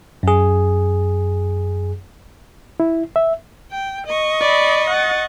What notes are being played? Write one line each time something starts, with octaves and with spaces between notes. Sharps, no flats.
F#2 G#4
E4
E5
G5
D#5 C#6
D5 B5
F#5 A6